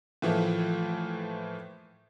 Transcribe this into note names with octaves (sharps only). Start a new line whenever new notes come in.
A2 E3 F3 A3 A#3